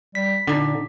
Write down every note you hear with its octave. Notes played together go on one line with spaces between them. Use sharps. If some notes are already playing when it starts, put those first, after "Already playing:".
G3 B6
A#2 D3 D4 D#4